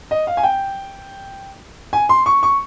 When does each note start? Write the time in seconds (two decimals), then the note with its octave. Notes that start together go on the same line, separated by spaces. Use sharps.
0.11 D#5
0.27 F5
0.37 G#5
0.43 G5
1.93 G#5
2.09 C6
2.26 C#6
2.43 C#6